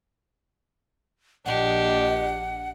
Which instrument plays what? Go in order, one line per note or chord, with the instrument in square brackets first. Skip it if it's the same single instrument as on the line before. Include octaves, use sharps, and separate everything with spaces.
[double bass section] A#1 [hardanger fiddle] D4 G4 [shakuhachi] D#5 [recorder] F#5